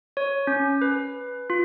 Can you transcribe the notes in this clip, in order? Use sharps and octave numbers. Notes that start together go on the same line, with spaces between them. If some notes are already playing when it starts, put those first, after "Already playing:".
C#5
C#4
B4
F4